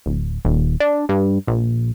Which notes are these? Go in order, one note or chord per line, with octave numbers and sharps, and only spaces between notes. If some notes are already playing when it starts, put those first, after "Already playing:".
D1
D#1
D4
G2
A#1